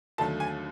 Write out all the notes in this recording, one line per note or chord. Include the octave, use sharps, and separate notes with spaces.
D#2 D3 F#3 A3 A5
G#5